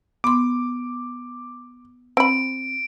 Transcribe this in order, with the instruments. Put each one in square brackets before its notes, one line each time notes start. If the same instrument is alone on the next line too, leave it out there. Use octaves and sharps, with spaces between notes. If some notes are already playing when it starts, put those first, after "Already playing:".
[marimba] B3 C6 [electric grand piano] D6
[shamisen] C4 B5 [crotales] D7